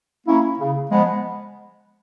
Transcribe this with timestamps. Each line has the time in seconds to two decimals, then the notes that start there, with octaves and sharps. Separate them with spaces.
0.27 A#3 C#4 E4
0.59 C#3
0.91 F3 G#3 B3